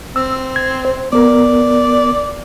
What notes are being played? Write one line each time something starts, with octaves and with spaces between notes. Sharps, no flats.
C4 E6
G#6
C5
B3 A#4 D5